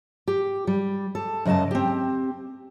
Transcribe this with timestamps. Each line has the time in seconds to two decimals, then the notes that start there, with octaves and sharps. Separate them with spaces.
0.28 G4
0.67 G3
1.15 A4
1.45 F#2 C#3 D#5 G#5 A5
1.71 C4 G4